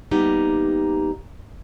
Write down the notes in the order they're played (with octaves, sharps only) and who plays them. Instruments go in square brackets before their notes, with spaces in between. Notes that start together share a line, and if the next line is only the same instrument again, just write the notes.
[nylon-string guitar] G3 A#3 B3 D#4 G4